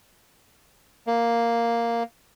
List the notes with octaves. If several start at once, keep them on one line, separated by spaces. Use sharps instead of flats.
A#3